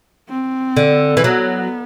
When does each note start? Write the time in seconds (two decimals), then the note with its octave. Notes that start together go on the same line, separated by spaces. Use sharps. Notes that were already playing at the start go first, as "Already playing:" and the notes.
0.29 C4
0.76 D3
1.17 E3
1.24 F#3 B3